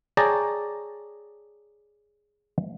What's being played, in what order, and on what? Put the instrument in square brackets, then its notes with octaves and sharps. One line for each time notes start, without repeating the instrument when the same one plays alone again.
[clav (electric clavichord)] G#4 C#5 D5 G5 A5 A#5